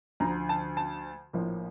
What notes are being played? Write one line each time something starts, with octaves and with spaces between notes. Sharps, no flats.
D2 D3 F3 A#5
A5
A5
A#1 A2 F3 A#3